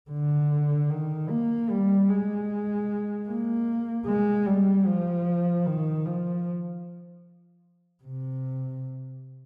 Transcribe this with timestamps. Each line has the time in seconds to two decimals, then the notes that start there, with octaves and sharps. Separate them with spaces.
0.11 D3
0.90 D#3
1.29 A#3
1.70 G3
2.09 G#3
3.28 A#3
4.07 G#3
4.46 G3
4.87 F3
5.67 D#3
6.05 F3
8.04 C3